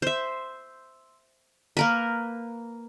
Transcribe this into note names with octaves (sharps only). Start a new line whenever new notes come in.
C5 E5
A#3 A#4 B4